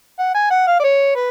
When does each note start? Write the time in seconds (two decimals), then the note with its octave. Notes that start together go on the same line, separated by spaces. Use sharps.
0.19 F#5
0.35 G#5
0.51 F#5
0.67 F5
0.80 D5
0.84 C#5
1.15 B4